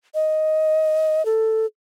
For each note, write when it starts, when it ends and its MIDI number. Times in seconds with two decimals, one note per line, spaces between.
0.15 1.25 75
1.25 1.66 69